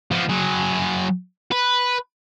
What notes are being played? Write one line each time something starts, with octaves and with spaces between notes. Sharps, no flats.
F3 B3
F#3 G#4
B4